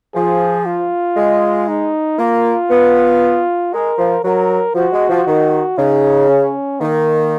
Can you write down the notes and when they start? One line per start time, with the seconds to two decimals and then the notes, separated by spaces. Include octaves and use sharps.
0.15 F3 G#4
0.65 F4
1.17 G#3
1.68 D#4
2.19 A#3 F4
2.70 B3
3.73 G#3 A#4
3.98 F3
4.24 F#3 A#4
4.75 F3 F#4
4.93 G#3
5.09 F3
5.27 D#3
5.78 C#3 D#4
6.28 C#4
6.80 D#3 A#3